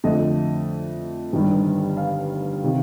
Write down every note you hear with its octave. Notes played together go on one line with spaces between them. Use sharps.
F2 D3 A3 D#5
G1 G2 D#3 G3
F5
C3 D#3